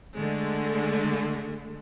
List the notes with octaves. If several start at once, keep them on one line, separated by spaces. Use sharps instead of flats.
D3 G#3 A3